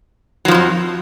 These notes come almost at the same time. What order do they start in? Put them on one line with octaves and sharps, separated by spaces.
F#3 F3 G#2 F2